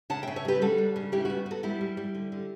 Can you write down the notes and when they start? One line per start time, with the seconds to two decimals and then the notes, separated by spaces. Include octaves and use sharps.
0.10 C#3 F#5 A5
0.23 E5 G5
0.28 C#3
0.36 C#5 E5
0.45 G3 G4 B4
0.61 G3 F#4 A4
0.78 D4
0.96 C#3
1.12 G3 E4 G4
1.25 B3 F#4
1.46 B3 F#4 A4
1.63 G3 E4 G4
1.81 G3
1.97 G3
2.15 D3
2.32 D3